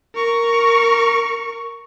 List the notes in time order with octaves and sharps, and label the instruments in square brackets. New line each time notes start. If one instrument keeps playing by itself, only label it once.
[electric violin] A#4 C#6